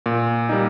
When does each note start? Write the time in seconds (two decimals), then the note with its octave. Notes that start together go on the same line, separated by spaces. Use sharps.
0.06 A#2
0.49 G3 A#3 D#4